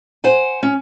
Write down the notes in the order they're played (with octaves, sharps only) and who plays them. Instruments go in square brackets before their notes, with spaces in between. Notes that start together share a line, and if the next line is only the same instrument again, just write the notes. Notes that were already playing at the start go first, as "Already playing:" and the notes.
[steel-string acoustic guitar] C5 F#5 G#5
C#4